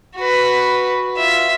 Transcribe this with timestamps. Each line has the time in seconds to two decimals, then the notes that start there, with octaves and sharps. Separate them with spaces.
0.16 F#4 B4
1.18 F4 E5